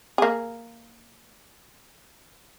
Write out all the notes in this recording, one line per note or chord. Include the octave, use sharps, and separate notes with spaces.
A#3 G#4